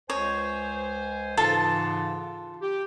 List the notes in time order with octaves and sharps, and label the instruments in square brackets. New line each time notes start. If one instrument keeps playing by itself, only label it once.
[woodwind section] C#2 C5 G#5 [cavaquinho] C#5
[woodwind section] G#2 C#3 E3 [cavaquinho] F4 A4 A5
[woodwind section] G4